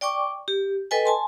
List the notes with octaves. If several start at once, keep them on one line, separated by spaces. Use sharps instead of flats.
D5 G5 C#6 D6
G4
A4 B4 D#5 G5 G#5
G#5 A5 C6